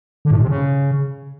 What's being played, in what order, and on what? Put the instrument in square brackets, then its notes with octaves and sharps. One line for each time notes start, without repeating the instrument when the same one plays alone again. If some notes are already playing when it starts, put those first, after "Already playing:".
[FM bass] D3
A2
G#2
C3
C#3